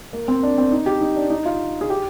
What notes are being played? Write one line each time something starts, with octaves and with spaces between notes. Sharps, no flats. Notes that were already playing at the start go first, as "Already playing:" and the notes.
A#3
C4
D4
C4
D#4
G4
D#4
D4
D#4
F4
G#4
G4